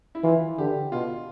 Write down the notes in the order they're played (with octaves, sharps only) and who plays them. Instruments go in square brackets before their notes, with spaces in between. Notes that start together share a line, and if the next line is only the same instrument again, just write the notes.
[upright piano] E4
[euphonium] E3 [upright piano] F4
[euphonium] D3 [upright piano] G4
[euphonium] B2 [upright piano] F4